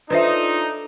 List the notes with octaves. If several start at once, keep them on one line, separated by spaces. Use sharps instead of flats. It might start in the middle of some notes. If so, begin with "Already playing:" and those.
D4 D#4 F4 A4 B4 C5 E5